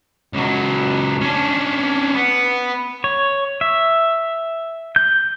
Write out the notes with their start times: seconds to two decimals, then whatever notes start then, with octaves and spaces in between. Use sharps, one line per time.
0.33 C#2 F#3
1.21 C#4 D4
2.15 B3
3.04 C#5
3.61 E5
4.96 G6